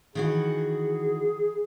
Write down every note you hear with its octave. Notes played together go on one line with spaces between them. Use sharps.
D#3 E3 F#4 G#4